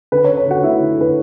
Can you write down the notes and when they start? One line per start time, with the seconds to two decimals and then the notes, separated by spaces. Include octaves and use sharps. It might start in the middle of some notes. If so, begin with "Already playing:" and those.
0.12 D3 B4
0.24 C#4 C#5
0.37 C#5
0.46 D3 F#4 F#5
0.63 A3 E4 E5
0.80 D3
0.98 D3 B4